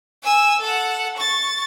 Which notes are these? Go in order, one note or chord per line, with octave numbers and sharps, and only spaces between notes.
G#5 E6
A4 F#5
C#6 A6